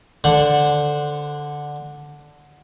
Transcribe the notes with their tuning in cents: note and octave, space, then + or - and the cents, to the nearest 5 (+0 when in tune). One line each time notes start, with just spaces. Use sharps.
D3 +0 C5 +0 F#5 -10